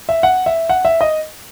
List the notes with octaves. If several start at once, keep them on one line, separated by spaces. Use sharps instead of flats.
E5
F#5
E5
F#5
E5
D#5